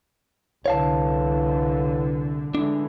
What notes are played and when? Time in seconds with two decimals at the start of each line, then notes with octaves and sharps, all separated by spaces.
0.66 C2 D3 E3 C#5 F5 A5
2.55 D3 E3 G#3 D4